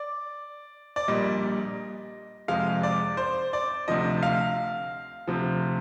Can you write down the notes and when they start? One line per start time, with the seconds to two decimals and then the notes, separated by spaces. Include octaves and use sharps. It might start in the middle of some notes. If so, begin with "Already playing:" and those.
Already playing: D5
0.96 D5
1.08 A#1 A#2 G3 D#5
2.48 F2 C3 F3 G#3 F5
2.83 D5
3.17 C5
3.53 D5
3.88 D2 C3 F3 D#5
4.23 F5
5.27 D2 C3 F3